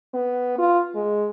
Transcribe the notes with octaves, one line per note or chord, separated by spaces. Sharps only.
B3
F4
G#3